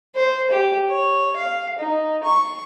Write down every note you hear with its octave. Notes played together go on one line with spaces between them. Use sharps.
C5
G4
C#5
F5
D#4
C#6